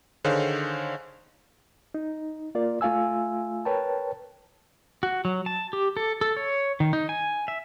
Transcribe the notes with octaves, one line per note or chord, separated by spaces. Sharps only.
D3 D#3 G#4 C5 C#5 F5
D#4
A#3 F4 A#4 D5
A3 F4 F5 G#5 E6
A#4 B4 C#5 G5 A5
F#4
F#3
A5
G4
A4
A4
C#5
D#3
D#4
G#5
E5